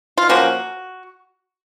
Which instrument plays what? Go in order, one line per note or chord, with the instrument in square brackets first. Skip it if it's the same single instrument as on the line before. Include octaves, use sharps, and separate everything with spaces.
[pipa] F4
F3 A#3 C#4 F#4